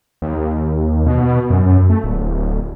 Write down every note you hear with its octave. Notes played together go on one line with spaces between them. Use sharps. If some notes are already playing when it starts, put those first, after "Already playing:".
D#2
B2
F#2
A3
D1